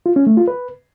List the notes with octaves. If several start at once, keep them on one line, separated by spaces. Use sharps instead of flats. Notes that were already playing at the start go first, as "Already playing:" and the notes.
F4
C#4
A3
F4
B4